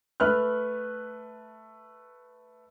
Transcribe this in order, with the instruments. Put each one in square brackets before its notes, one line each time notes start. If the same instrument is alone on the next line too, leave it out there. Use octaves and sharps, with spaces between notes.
[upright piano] A3 B4 F6 F#6